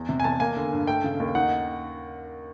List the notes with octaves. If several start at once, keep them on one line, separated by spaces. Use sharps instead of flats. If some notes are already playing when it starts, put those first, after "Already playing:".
Already playing: E2
C3
G#5
E2 A5
A#3 G#5
D3
G2
A3 G5
C#3
D#2
D#4 F#5